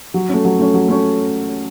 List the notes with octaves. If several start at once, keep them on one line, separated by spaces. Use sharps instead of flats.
F#3
A3 C#4
F#3
A3 C#4
F#3
A3 C#4